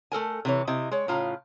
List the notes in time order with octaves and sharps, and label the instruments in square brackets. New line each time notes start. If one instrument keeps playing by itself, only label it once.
[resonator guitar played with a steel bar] A3 A4 A#4 G#5
C3 E3 C#5
C3 E4 D#5
G#3 C#5
A2 C#3 F4 A#5